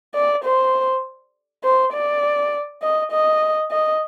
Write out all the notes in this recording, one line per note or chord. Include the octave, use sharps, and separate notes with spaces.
D5
C5
C5
D5
D#5
D#5
D#5